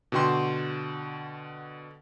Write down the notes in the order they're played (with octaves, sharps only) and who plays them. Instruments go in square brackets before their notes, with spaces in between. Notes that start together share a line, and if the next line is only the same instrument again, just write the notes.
[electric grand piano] B2 D3 F#4 G5 C6